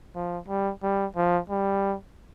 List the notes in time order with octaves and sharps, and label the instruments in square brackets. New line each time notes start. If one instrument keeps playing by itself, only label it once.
[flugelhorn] F3
G3
G3
F3
G3